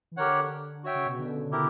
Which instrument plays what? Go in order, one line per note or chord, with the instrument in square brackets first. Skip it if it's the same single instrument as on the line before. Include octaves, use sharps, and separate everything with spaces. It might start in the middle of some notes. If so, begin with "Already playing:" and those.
[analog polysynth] E3
[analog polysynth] D3 [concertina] G4 A#4 C#5 F#5
[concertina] F#4 C#5 E5 G5
[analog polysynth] C#3
B2
D3
[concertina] E4 G4 A#4